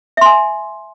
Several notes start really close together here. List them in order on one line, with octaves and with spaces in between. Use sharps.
E5 C6 G#5